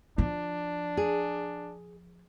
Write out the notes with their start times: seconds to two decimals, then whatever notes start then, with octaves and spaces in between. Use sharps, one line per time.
0.18 F3 D4
0.97 G#4